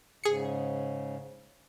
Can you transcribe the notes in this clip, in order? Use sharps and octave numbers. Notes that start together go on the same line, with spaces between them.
G#2 C#3 G#4 C#7